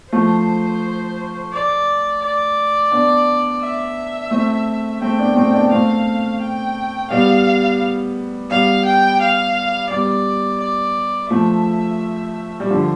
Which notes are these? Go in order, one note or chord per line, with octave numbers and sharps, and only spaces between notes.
F3 A3 C5
D5
D5
B3 D4
E5
A3 C4
A3 C4 G5
B3 D4
A3 C4
B3 D4
A3 C4 F5
G5
G3 B3 F5
G3 B3 F5
G5
F5
G3 B3 D5
D5
F3 A3 E5
G3
D3 F3